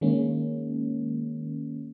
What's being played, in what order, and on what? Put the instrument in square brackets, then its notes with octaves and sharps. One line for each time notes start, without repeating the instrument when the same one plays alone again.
[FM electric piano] D#3 G#3 A#3 C#4